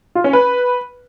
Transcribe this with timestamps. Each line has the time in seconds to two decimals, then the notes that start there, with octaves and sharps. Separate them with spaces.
0.15 F4
0.24 C#4
0.33 B4